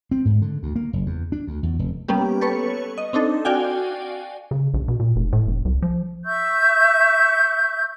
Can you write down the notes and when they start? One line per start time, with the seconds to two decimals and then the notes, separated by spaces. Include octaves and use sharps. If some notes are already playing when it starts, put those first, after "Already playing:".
0.11 C4
0.25 G#2
0.42 D3
0.63 D2
0.76 A#3
0.93 F#1
1.06 E2
1.32 D4
1.47 D2
1.63 E2
1.79 F1
2.08 G3 A#3 B3 C#4 G4
2.41 A4 B4 C#5 C#6
2.98 D#5
3.13 C4 D4 D#4 A4
3.45 F#4 D5 F5 G5 G#5
4.51 C#3
4.74 A#1
4.88 B2
5.00 A#2
5.16 F1
5.32 A2
5.47 F1
5.65 C2
5.82 F3
6.25 E5 C#6 E6 G6